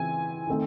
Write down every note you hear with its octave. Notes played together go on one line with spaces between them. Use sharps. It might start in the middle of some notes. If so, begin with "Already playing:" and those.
Already playing: C#3 E3 C4 G#5
D#3 A3 C4 D#4